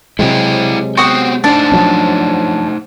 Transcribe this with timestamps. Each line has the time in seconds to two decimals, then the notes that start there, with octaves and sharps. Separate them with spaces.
0.19 C3 F#3 G#3 E4 C5 G5
0.97 B3 C4 F#4 G5 D#6
1.44 A3 D4 D#4 C5 A5
1.72 F3 F#3 C#4